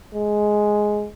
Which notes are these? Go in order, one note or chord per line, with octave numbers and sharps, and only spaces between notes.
G#3